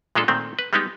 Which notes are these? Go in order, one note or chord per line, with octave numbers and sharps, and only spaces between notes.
A#2 G#3 D4 F4 A4
A#2 D#3 A3 C4
B4
G3 G#3 B3 D#4 G4